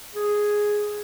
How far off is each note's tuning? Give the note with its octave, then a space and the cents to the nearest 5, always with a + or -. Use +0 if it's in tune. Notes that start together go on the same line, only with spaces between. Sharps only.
G#4 +0